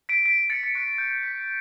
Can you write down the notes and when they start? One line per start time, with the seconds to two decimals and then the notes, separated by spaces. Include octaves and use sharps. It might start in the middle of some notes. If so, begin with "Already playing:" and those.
0.09 B6 D7
0.25 B6 D7
0.50 A6 C#7
0.63 C#7
0.75 C#6 F#6 B6
0.98 G6
1.23 B6